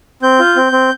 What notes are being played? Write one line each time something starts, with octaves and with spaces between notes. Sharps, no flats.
C4 G6
F4
C4
C4